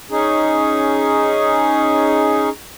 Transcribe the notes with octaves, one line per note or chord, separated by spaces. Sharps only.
C#4 D#4 G#4